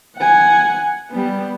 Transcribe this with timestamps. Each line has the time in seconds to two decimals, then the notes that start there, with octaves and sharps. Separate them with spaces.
0.17 F#5 G#5
1.11 G3 B3